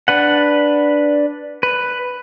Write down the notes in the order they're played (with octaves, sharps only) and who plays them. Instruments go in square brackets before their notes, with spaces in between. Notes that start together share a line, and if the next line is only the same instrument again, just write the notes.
[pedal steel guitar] D4 B4 F#5
B4